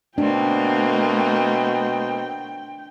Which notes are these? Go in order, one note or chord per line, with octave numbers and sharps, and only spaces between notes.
B2 A3 A#3 C4 D4 G5